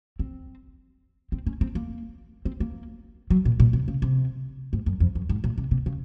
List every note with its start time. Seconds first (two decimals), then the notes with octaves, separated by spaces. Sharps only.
0.19 C4
1.32 C4
1.47 C#4
1.61 C4
1.75 A#3
2.45 C4
2.60 A#3
3.30 F#3
3.45 A#2
3.60 A#2
3.73 C3
3.88 C#3
4.02 C3
4.73 G#2
4.86 F#2
5.00 F2
5.15 F#2
5.29 G#2
5.44 A#2
5.58 C3
5.71 C3
5.86 C#3